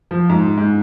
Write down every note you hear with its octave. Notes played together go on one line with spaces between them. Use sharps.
F3
G#2
G#2